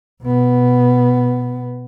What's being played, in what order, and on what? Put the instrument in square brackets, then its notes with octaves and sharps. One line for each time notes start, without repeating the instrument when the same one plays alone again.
[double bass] B2 B3